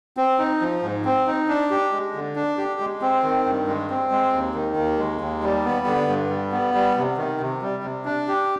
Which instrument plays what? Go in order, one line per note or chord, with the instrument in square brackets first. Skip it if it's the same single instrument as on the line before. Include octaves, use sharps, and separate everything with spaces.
[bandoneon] C4
D#4
F3
G#2
C4
D#4
D4
G4
G#3
D3
D4
G4
G#3
C4
D#3
G2
G#3
C4
G#3
D#2
D#3
D#2
G#3
D#2
G3
B3
D3
G2
G3
B3
G3
C3
D#3
C3
G3
C3
D4
G4